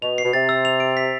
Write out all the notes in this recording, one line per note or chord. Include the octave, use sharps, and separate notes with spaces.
B2 F7
C7
B2
C3 A6
E6
F7
D7
B6